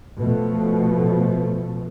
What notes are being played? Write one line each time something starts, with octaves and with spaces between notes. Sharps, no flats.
B2 F3 A3